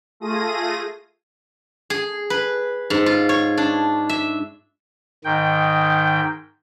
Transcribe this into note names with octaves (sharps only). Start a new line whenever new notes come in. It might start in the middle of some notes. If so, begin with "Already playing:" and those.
A3 F4 G#4 A#6 D#7
G#4
B4
G#2
F4
C#5
D4
E5
G#2 D#3 G5